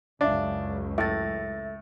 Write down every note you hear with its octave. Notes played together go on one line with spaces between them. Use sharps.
C#2 F#2 D4 E5 F5
A2 A4 E5 A6